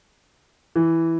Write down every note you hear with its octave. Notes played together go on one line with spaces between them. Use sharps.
E3